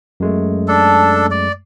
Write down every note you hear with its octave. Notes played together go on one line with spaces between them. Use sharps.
F#2 G#3 A3
D4 A4
D5